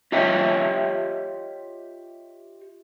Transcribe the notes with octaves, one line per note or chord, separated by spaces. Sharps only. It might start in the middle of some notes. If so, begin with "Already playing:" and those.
F4 G4 C#5 D#5 E5 G5